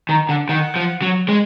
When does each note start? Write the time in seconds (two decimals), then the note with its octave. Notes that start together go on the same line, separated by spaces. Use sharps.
0.09 D#3 A#5
0.29 D3 F#5
0.49 D#3 F#5
0.76 F3
1.02 F#3
1.29 G#3